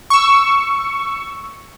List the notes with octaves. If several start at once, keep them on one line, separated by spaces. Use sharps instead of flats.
C#6 E6